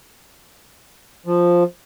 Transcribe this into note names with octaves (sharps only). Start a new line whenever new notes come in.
F3